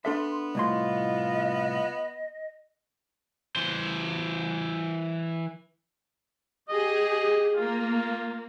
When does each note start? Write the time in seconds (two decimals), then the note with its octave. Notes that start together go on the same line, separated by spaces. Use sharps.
0.05 B3 D4 A4 E5 C6
0.55 C2 A2 F4 D#5 C6
3.56 E3 C5
6.69 G4 G#4 D#5
7.57 A#3 F4